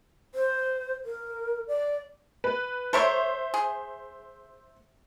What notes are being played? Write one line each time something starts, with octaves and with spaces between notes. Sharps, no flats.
C5
A#4
D5
B4
A4 A#4 C5 C#5 E5
G#4